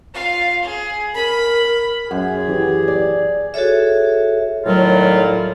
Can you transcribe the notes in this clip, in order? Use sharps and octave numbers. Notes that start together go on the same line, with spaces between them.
F4 F5
G#4
A#4 B5
F#2 G#4 F#5
E3 G4
D5
F#4 G#4 A4 C#5 E5
A2 D#3 F#3 G3 F4